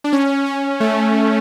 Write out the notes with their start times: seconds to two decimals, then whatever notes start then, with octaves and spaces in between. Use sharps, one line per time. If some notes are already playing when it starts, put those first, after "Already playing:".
0.04 D4
0.13 C#4
0.46 C#4
0.80 A3